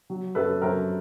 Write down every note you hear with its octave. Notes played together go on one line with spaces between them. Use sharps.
F#3
F#2 A4 B4
F#2 A#4 C5